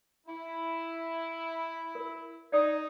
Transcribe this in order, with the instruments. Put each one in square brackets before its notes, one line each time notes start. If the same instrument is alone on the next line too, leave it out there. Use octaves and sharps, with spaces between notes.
[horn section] E4
[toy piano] A#4
[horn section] D#4 [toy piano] D5 D#6